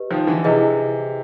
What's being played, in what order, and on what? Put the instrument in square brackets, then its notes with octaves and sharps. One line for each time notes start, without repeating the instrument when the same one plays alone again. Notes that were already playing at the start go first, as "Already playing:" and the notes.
Already playing: [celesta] G4 B4 D#5
[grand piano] D#3 F3
D3 E3
[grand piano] C3 [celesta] E4 G#4 B4 D#5 G#5